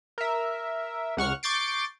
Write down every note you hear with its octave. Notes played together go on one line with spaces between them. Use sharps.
A#4 E5
C#2 F#5 C#6 F6
C#6 D6 G6 A6 C7 D7